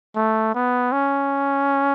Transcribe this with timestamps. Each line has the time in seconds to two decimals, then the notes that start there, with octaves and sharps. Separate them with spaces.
0.16 A3
0.54 B3
0.92 C#4